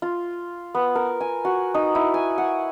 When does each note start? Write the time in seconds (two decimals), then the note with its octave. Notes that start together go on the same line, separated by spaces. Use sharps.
0.02 F4
0.75 B3
0.95 A#4
1.21 G#5
1.45 F#4
1.74 D#4
1.95 E4
2.14 G#5
2.38 F#5